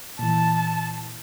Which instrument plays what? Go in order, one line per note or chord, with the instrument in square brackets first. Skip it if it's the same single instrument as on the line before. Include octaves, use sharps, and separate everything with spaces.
[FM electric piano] A#2 E3 [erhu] A5